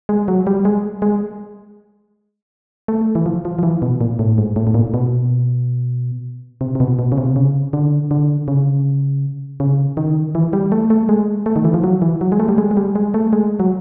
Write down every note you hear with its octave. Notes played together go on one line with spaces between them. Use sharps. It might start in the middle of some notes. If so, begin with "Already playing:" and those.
G#3
F#3
G3
G#3
G#3
A3
E3
F3
F3
F3
E3
B2
A#2
A2
G#2
A2
A2
A#2
B2
C3
C3
B2
B2
C#3
C3
C#3
D3
D3
C#3
C#3
D#3
E3
G3
A3
A3
G#3
A3
D#3
E3
F3
F#3
E3
F#3
G#3
A3
G3
G#3
G#3
G3
G#3
A3
G#3
F#3